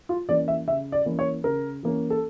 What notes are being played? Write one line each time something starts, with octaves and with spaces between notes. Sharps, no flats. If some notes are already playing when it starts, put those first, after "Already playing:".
F4
E3 A#3 C#4 D5
E5
C#3 E5
D5
E3 A#3 C#4
C#5
C#3 A#4
E3 A#3 C#4
A4